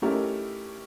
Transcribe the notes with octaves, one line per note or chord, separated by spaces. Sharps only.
A3 C#4 D#4 E4 G4 A#4